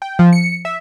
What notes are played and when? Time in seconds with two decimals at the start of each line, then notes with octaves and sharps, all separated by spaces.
0.02 G5
0.19 F3
0.33 C#7
0.65 E5